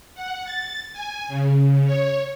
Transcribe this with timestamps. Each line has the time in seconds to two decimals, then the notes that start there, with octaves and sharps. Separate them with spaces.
0.15 F#5
0.44 A6
0.93 G#5
1.28 C#3
1.86 C#5